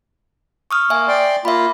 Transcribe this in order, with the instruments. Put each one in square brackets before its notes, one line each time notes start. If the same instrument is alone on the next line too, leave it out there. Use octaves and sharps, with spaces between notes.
[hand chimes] C#6 D#6 F6
[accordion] A#3 [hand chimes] E5 G#5
[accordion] D5 G5 C6
[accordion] A#3 F4 [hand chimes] E5 B5